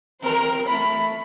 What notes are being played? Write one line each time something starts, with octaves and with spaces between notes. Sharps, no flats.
C4 A#4
A3 B5